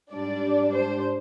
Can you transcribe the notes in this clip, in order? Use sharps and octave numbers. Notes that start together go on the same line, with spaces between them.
G#2 G3 D4 D5
C5